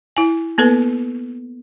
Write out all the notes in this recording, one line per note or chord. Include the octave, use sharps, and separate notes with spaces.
E4 G#5
A#3 B3 A4 B4